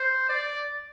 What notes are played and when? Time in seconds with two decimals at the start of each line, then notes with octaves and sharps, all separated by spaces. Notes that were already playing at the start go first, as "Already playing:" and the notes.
Already playing: C5
0.29 D5